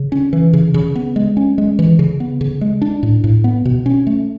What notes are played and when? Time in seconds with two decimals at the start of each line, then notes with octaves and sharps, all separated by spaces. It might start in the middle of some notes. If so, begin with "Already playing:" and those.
Already playing: C#3
0.12 C#4
0.33 E3
0.53 C#3
0.74 C#3
0.95 B3
1.16 G#3
1.37 C#4
1.58 G#3
1.79 E3
1.99 C#3
2.20 B3
2.41 C#3
2.61 G#3
2.82 D4
3.03 A2
3.24 A2
3.44 B3
3.65 B2
3.86 C#4
4.07 A3